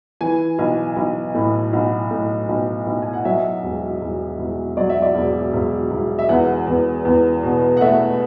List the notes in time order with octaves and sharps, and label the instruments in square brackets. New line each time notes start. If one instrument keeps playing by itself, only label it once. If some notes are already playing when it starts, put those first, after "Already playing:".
[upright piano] E3 G#5
B1
B1
A2
B1 F#5
A2
B1
B1
G#5
F#5
F#3 E5
E1
E1
E1
F#3 D5
E5
D5
E1
E1
E1
E5
E2 F#5
E2
E2
B2
F#5
A3 E5